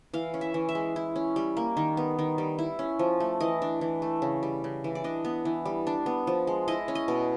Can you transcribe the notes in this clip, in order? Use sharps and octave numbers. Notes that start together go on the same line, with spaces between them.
E3 F5
C#4
E5
E3
E5
G#3
E4
C#4
G3
A#3
D#3
B3
D#3
G3
E4
C#4
F3
A3
E3 D#5
D4
E3
A3
C#3
G3
C#3
E3
D5
D4 D#5
B3
E3
G3
D4
B3
F3
G#3
E4 D#5
C#4
D#5
B2